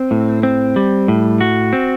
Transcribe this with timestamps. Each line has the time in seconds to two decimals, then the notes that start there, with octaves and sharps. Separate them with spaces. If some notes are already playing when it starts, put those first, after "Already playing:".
Already playing: C4
0.11 A2
0.43 C4
0.76 G3
1.08 A2
1.41 F#4
1.73 C4